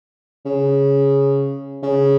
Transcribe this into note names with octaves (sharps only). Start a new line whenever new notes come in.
C#3
C#3